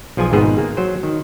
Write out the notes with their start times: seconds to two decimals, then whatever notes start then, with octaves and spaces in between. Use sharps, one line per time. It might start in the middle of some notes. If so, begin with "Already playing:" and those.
0.17 B1 F3 F4 G#4 G#5
0.33 G#1 G#2 B3 D#4 G#4 C5
0.58 A#3
0.77 F#3 C5
1.03 D#3